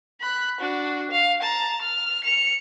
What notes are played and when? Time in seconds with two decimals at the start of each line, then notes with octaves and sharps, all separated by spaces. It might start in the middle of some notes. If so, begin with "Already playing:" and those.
0.21 B5 F#6
0.61 D4 F#4
1.11 F5
1.42 A5 A#5
1.81 F6
2.24 C#7 F7